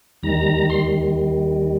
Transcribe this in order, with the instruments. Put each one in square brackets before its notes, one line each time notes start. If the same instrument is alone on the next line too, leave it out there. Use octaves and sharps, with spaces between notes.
[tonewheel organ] D#2 D#3 G3 A#5
C6